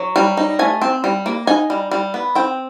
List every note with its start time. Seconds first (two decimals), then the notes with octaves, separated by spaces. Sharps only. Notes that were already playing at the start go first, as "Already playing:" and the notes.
Already playing: F#3
0.16 G3
0.37 D#4
0.59 A3 G#5
0.82 C4
1.04 G3
1.26 A#3
1.47 D#4 G#5
1.70 G3
1.91 G3
2.14 B3
2.35 C4 G5